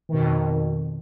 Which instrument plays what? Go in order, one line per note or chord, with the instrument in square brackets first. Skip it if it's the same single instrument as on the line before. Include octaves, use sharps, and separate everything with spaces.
[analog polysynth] D#3
B2
F2